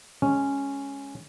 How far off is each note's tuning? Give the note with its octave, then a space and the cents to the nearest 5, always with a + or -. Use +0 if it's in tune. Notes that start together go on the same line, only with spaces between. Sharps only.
G#3 +0 C#4 +0